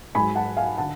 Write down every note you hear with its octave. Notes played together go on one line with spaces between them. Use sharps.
G#2 F#3 G#5 B5
F#5 A5
F5 G#5
D3 F#5 A5